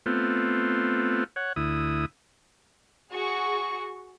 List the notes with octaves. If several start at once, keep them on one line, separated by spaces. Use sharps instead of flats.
A3 B3 C4 F4
C#5 F#5
D2 E4 D#6
F#4 G#4 C#6